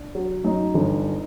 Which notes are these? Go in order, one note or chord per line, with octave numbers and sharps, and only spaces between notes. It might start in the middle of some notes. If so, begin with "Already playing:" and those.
Already playing: D4
F#3
F#2 D#4 D#5
G1